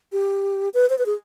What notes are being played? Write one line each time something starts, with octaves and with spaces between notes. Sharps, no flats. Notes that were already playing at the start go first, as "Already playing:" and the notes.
G4
B4
C5
B4
G#4